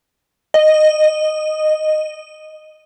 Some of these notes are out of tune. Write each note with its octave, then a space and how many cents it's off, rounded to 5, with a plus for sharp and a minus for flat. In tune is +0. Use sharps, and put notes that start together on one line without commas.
D#5 -10